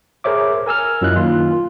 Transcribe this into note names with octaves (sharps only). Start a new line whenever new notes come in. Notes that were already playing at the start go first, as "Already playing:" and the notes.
G#4 A#4 C5 C#5 E5 D6
A#4 G#5 E6 F6
F#2 F#3 E4 F4 D#5 F#6
D#3 A#3 F4